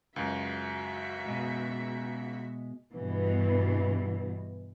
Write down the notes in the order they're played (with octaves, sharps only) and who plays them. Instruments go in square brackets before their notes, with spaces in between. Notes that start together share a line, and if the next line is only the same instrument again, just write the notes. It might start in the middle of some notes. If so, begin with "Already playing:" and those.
[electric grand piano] C#2 F#2 [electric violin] F#4 E5
[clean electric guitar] B2 G#3
[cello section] G2 B2 E3